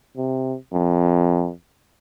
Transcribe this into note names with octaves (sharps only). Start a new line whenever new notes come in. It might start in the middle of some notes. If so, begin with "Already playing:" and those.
C3
F2